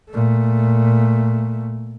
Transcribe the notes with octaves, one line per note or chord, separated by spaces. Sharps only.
A#2 A3